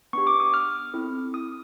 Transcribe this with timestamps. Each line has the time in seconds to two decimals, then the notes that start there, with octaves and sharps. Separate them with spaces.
0.13 B3 D4 G4 C#6
0.27 D6
0.40 D#6
0.54 F6
0.93 C4 E4 A4
1.34 D#6